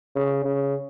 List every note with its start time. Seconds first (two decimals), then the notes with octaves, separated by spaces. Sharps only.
0.16 C#3
0.45 C#3